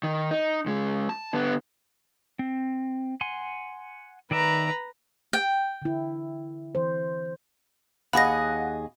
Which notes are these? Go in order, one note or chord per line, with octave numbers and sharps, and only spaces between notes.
D#3
D#4
C#2 G#3
A5
D3 B3
C4
F#5 G#5 C6
D#3 B4 D5 E5 A#5
G5
D3 E4
E3 C5
D#2 G#4 D#5 F5 F#5 B5 A#6